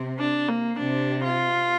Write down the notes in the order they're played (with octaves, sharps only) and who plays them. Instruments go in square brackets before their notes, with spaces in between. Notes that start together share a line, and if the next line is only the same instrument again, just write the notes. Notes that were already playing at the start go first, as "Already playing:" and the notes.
Already playing: [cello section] C3
[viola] D4
A#3
[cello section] C3 [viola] D4
[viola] F4